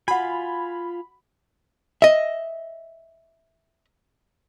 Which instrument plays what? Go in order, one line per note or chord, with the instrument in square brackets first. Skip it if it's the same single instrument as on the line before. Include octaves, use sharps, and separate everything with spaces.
[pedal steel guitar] F4 G#5 [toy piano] F#4 F#5 [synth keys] B5
[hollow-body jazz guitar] D#5 E5